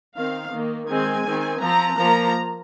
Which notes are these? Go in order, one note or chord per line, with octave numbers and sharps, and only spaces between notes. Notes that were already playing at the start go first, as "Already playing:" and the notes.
D#3 C4 F5
D#3 A#3
D#3 G#3 C4 G#5
D#3 C4
F3 C4 A#5
F3 A#3 A#5